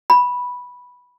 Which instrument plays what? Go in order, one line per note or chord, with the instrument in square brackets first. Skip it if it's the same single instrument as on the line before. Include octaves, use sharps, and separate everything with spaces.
[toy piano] B5